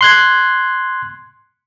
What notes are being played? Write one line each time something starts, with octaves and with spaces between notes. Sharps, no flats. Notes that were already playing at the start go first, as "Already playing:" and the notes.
C6 F#6 G#6